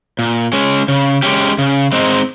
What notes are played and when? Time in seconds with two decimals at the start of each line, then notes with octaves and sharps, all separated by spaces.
0.19 A#2
0.53 G#3 C#4
0.88 C#3
1.23 G#3 C#4 G4
1.58 C#3
1.92 G#3 C4 D#4